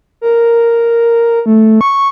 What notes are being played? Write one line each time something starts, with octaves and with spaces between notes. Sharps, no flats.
A#4
A3
C#6